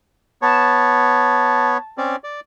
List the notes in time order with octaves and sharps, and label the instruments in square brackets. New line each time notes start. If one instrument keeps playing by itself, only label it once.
[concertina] B3 C#5 [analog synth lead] A5
[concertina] C4 C#4 D5
D5